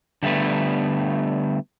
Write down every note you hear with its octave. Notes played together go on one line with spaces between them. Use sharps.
D3 G3 A3 B3